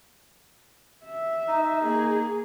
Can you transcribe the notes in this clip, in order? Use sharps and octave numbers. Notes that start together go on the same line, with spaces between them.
E5
D#4
A#3 G#4